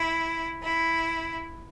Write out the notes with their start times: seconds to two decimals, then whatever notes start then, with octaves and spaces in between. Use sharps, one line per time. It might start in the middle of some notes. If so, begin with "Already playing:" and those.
Already playing: E4
0.63 E4